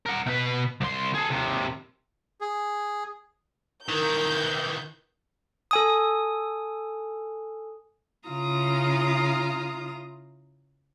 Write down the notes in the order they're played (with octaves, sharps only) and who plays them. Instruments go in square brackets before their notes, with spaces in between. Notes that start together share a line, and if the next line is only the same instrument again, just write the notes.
[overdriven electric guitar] A#4 F#5
B2 B4
C2 C6
G#4 A4
D#2 C3
[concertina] G#4
[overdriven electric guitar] D#3 E3 [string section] A#4 [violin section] G6
[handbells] A4 G#5 D#6
[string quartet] C#3 E4 F4 F5 A#5 D#6